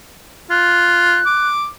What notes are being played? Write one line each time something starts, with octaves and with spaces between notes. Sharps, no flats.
F4 F#6
D6